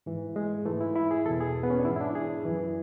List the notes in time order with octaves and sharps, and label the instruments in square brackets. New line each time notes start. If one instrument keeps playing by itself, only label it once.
[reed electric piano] G#2 E3
G#3
E3 A3
G#2
E4
E4
G#4
E2 A4
B2
G#4
B3
C#4
D4
G#2 E3 E4
E4
D4
G#4
F#2 E3